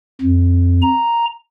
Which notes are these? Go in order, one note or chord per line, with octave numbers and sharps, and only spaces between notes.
F2
A#5